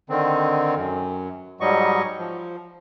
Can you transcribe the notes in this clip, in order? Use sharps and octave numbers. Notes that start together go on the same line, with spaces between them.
D3 D#3 C4
F#2
G#2 F#3 G3 D#5 C#6
F3